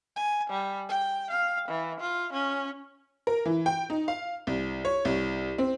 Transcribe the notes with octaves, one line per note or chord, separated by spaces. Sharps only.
G#5
G3
G5
F5
E3
F4
C#4
A#4
E3
G5
D#4
F5
C2
C#5
C2
C4